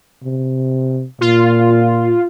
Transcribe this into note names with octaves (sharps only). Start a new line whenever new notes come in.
C3
A#2 F4